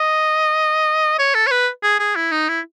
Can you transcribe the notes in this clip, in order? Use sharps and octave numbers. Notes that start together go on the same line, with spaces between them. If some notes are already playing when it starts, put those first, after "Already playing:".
Already playing: D#5
C#5
A4
C#5
B4
G#4
G#4
E4
D#4
E4